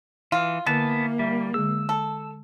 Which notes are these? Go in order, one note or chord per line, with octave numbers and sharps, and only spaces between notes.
E3 F4
D3 E3 A#3 B3 A5
G3 E5
D3 G#3 G#4 E6
A4